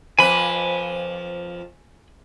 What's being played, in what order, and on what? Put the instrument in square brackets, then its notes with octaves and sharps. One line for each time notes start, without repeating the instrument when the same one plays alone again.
[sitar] F2 F3 B4 [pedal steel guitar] G#5 B5